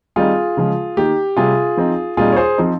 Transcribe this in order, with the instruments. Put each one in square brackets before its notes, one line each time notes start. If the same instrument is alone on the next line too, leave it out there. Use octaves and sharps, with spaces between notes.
[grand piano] D#3 G3 C4 D#4 F4 G#4
C#3 F3 G#3
D#3 A#3 D#4 G4
C3 G3 C4 F4 G#4
F3 C4 D#4
A#2 G3 C4 D#4 F4 G#4
C#5
G#4 C5
F3 C4 D#4